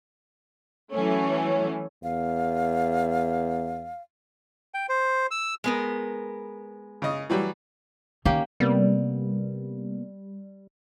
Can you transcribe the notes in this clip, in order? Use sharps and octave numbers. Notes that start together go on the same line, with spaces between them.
E3 F#3 A3 C#4
E2 F5
G5
C5
E6
G#3 B3 A#4
C#3 D#5
E3 F#3 G3
D#3 A#3 C#4 G4
C3 G3 A#3 B3